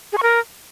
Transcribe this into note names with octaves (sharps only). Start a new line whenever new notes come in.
G#4
C#6
A#4